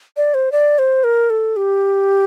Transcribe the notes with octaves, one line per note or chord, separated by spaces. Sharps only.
D5
C5
D5
C5
A#4
A4
G4